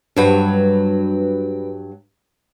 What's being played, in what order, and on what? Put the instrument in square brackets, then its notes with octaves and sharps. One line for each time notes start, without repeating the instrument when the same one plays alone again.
[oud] G2 F#3 [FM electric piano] D4 B4